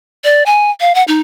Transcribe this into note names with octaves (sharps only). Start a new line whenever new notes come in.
D5
G#5
F5
F#5
D#4